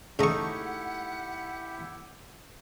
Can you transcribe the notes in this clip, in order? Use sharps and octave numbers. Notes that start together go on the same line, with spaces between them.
C#3 A3 D#4 E4 G4 F#5 C#6